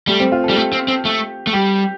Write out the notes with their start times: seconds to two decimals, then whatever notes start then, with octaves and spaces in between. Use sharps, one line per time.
0.07 G3 A3
0.19 C4
0.32 F4
0.44 A4
0.49 G3
0.56 A3 G4
0.73 C4
0.88 C4
1.05 A3
1.47 A3
1.53 G3 G4